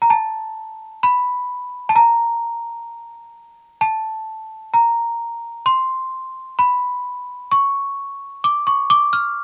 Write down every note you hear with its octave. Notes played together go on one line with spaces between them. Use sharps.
A#5
A5
B5
A5
A#5
A5
A#5
C6
B5
C#6
D6
C#6
D6
F6